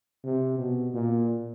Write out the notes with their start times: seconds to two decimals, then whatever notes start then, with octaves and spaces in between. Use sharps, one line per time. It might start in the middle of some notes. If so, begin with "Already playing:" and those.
0.24 C3
0.58 B2
0.94 A#2